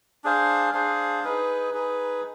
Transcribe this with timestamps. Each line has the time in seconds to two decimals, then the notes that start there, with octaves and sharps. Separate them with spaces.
0.24 D4 G#4 C5 F5
0.73 D4 G#4 C5 F5
1.24 D#4 G#4 B4
1.73 D#4 G#4 B4